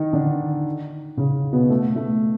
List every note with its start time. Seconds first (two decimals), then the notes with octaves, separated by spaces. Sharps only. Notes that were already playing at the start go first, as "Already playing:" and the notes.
Already playing: D#3 D#4
0.13 D3 D4
1.17 C#3 C#4
1.53 B2 B3
1.70 A3
1.96 A3